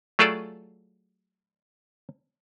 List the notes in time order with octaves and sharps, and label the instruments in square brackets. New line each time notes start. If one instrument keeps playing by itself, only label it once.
[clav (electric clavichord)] F#3 A3 F4 G#4 A4 D5